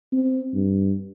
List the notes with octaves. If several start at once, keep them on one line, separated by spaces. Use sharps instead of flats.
C4
G2